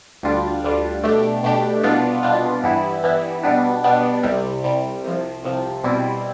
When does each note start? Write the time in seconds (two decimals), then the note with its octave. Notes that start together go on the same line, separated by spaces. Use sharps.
0.23 D2 D3 G3 D4 F4
0.64 D2 D3 G3 D4 F4
1.03 B2 A3 D4 G4
1.43 B2 A3 D4 G4
1.83 C2 B2 B3 D4 F4
2.23 C2 B2 B3 D4 F4
2.64 G2 E3 G3 B3 E4
3.03 G2 E3 G3 B3 E4
3.43 B2 G3 B3 D4
3.84 B2 G3 B3 D4
4.23 C2 C3 G3
4.64 C2 C3 G3
5.04 C2 C3 F3
5.43 C2 C3 F3
5.84 B2 G3 C4 E4